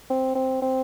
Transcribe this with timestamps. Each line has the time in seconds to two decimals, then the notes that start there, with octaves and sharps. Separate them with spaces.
0.10 C4
0.35 C4
0.62 C4